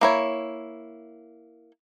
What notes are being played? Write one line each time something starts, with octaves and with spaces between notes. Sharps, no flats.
A#3 E4 C#5